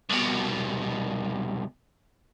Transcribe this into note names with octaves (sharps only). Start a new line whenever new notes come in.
C2 B2